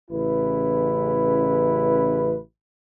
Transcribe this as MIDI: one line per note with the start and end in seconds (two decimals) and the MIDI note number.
0.11 2.36 33
0.11 2.36 49
0.11 2.36 64
0.11 2.36 71